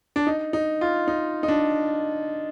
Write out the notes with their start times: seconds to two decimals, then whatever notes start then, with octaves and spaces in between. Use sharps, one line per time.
0.16 D4
0.27 D#4
0.53 D#4
0.81 F4
1.08 D#4
1.43 D#4
1.48 D4